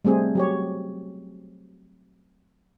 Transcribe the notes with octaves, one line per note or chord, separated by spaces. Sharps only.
G3 A3 C4 G#4
F#3 G4 C#5